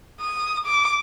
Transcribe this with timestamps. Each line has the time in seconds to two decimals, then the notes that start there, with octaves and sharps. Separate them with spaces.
0.21 D#6
0.66 D6